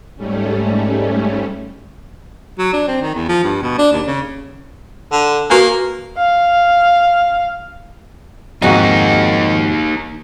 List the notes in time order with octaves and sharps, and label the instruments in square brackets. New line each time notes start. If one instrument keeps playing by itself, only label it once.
[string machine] G#2 G3 A3 C#4
[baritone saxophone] F#3
D4
C4
D#3
E2
F3
G2
B2
D4
D#2
C#3
D3
[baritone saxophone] A#3 [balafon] F#4 B4 G#5
[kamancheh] F5
[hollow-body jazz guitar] F2 G#2 F#4 [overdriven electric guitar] A#3 D#4